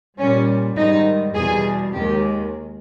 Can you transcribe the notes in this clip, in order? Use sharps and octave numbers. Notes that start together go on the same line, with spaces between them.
A#2 G3 C#4
G#2 D#3 G3 D#4
E2 B2 G3 G#4
D#2 D#3 G#3 G4